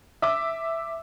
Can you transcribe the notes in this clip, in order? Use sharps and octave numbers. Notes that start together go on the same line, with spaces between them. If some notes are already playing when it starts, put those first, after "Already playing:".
E5 D6 E6